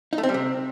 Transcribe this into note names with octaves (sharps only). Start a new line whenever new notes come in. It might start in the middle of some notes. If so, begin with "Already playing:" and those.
D#4
A3
C4
G3
C3